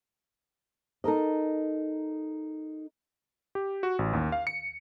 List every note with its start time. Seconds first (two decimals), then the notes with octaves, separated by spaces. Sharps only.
1.04 D#4 A4 A#4 D#5
3.55 G4
3.83 F#4
3.99 A1
4.13 D#2
4.32 F5
4.47 C#7